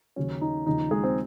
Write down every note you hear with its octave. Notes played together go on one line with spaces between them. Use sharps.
D#2 C#3 F#3 C#4
D#4
D#2 C#3 F3 D#4
G#3 G#4
C4 C5